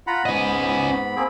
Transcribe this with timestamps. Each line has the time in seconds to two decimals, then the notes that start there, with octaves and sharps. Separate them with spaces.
0.07 F4 F#5 A#5 B5
0.26 G#2 B3 C#4 D#5
1.16 A#3 C4 G#4